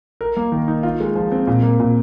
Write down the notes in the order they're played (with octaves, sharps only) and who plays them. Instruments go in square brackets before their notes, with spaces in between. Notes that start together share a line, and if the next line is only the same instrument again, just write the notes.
[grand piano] A#4
A#3
D#3
D#4
F4
G#3
F3
C4
A#2
A#3
A#2